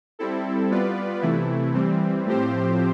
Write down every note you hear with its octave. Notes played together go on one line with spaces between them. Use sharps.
G3 C4 E4 A4
G3 B3 F4 B4 D5
C3 E3 A3 E4
E3 G3 C4
A2 F3 C4 G4 C5